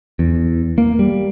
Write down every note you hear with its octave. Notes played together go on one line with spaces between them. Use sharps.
E2
A#3
G3